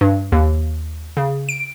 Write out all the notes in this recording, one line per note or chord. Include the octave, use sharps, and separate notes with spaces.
G2
D#2
C#3
D7